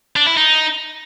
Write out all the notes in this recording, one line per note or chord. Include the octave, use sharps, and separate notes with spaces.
D4
E4
D#4